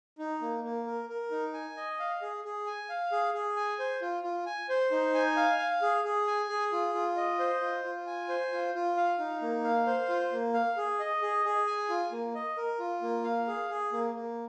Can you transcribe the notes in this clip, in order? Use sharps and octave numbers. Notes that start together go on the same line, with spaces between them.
D#4
A#3
A#3
A#4
A#4
D#4
G#5
D#5
F5
G#4
G#4
G#5
F5
G#4
G#4
G#5
C5
F4
F4
G#5
C5
D#4
G#5
F5
F5
G#4
G#4
G#5
G#4
F4
F4
D#5
C5
F4
F4
G#5
C5
F4
F4
F5
D#4
A#3
F5
C5
F4
A#3
F5
G#4
D#5
G#4
G#4
G#5
F4
A#3
D#5
A#4
F4
A#3
F5
G#4
G#4
A#3
A#3